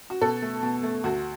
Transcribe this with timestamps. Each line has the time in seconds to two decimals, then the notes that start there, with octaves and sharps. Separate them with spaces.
0.10 F#4
0.21 B2 A4
0.42 A3
0.63 B2
0.83 A3
1.04 D2 F#4